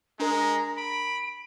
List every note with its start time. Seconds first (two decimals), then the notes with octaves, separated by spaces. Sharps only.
0.20 G#3 D4 A#4 A#5
0.77 B5 D7